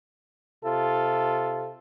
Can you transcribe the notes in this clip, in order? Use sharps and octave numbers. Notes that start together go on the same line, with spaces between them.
C3 F4 A4